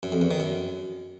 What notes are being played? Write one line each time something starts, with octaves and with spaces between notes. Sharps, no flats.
F#2
F2
E2
D#3
F#2